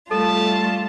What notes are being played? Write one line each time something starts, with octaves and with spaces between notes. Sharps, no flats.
G3 A3 F4 A4 A5